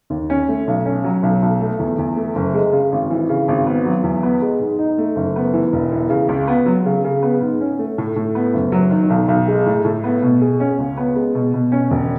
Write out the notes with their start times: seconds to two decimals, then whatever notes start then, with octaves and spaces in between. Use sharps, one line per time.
0.10 D#2
0.30 C#4
0.48 A3
0.67 B1
0.86 C#4
1.04 F#3
1.23 B1
1.42 B1
1.60 A3
1.79 E2
1.98 E2
2.16 A3
2.35 F#1
2.54 G#3
2.72 C#3
2.92 G#1
3.10 E3
3.29 C#3
3.48 G#1
3.67 B3
3.85 F#3
4.04 E2
4.23 B3
4.42 G#3
4.60 G#2
4.78 D#4
4.98 A3
5.16 F#1
5.36 B3
5.53 E3
5.73 E1
5.92 E3
6.10 C#3
6.28 C#2
6.48 B3
6.66 F#3
6.86 C#3
7.04 C#3
7.23 B3
7.41 G#2
7.61 C#4
7.79 A3
7.98 A2
8.16 A2
8.35 B3
8.54 F#1
8.72 F#3
8.91 D#3
9.10 B1
9.28 B1
9.48 G#3
9.66 A2
9.85 A2
10.04 B3
10.23 B2
10.41 G#4
10.60 C#4
10.79 C#2
10.97 B3
11.16 G#3
11.35 B2
11.54 B2
11.72 C#4
11.90 E1